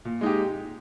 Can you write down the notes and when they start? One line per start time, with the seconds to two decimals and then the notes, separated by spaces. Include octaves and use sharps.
0.05 A#2
0.21 G#3 D#4 G4